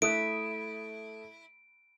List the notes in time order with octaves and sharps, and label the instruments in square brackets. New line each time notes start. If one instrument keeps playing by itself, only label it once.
[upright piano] A3 D#6 F#6 [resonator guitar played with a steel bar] E4 [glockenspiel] D7